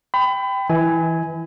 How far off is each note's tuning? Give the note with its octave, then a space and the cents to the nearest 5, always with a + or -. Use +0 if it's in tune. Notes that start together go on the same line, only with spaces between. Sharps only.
G5 +0 B5 +30
E3 +0 E5 -45 G#5 +0